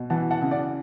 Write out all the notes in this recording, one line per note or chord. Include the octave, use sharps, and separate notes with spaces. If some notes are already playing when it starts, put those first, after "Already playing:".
Already playing: B2
E3 F#5 A5
F#5 A5
C#3
D5 F#5